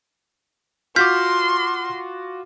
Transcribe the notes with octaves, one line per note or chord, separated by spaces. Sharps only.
F4 F#4 C6 D6 F6 G6 B6